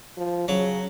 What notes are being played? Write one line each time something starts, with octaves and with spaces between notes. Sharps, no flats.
F3
C#3 F#3